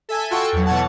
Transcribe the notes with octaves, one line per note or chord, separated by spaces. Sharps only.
A4 E5 G#5
F4 F#4 A4 G5 C#6
E2 F#3
B2 E3 C#5 F#5 A5